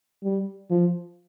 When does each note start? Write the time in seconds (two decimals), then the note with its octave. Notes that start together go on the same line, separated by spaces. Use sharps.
0.24 G3
0.71 F3